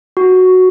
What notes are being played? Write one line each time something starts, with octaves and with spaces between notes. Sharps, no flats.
F#4